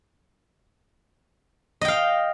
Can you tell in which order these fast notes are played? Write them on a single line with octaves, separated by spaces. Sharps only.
D#5 G5 F5